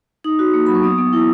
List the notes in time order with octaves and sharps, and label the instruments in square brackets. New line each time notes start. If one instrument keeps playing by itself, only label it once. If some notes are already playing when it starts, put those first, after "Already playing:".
[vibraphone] D#4 D#6
F#4
A#3
F#3 B5
C#6
B3 D#6
B3
E4